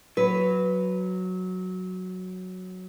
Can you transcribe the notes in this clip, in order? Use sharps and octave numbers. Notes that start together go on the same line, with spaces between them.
F#3 B4